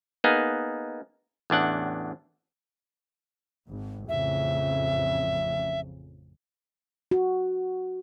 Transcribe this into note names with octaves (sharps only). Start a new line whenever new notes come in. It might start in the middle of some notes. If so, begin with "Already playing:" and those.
A#3 B3 D#4 G#4
A1 E2 D4 F#5
G#1
A1 F2 C#3 E5
F#4